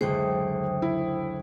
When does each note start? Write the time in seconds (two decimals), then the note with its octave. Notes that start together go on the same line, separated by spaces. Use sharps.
0.01 F#1 D2 G#3 C5 G5 D#6
0.82 E4